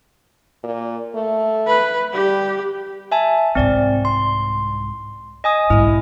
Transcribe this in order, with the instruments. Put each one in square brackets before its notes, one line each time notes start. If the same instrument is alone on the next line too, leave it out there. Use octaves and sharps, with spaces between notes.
[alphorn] A#2
A3
[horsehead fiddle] B4
[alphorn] G3 [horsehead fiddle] G4
[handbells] E5 G#5 A5
[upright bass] C2 G#2 [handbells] C4 D5
[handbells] C6
D#5 G#5 D#6
[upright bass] B1 G#2 [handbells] E4